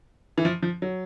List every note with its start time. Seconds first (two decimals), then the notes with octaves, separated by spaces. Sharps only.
0.38 E3
0.45 F3
0.62 F3
0.82 F#3